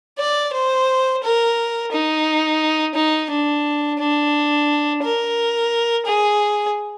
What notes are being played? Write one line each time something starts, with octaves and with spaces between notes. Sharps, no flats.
D5
C5
A#4
D#4
D#4
D4
D4
A#4
G#4